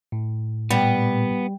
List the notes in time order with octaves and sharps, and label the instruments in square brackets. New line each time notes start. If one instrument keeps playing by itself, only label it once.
[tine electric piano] A2
[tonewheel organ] A#2 [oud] G3 [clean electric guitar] B3